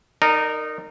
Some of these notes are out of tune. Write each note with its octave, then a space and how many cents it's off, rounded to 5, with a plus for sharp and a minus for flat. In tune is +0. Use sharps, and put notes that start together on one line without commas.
D#4 -15 A#4 -15 D5 +15